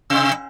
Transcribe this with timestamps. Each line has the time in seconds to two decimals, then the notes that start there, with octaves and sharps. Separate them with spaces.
0.10 C3